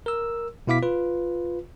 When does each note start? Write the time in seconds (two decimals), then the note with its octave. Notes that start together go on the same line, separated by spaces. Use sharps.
0.06 A#4 E6
0.67 B2 B3 E4 F5 D6 B6
0.83 F4 B4